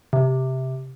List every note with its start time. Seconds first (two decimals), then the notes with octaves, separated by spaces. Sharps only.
0.13 C3